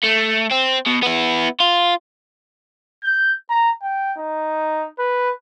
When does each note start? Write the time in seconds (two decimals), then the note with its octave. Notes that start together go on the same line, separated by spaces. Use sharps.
0.04 A3
0.51 C4
0.86 B2
1.03 B3 E4
1.60 F4
3.04 G6
3.50 A#5
3.83 G5
4.18 D#4
4.99 B4